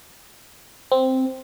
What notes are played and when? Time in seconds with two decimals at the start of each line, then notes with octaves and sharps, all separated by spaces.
0.92 C4